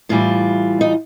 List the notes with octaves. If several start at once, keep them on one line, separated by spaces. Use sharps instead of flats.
A2 E3 G3 F4
D#4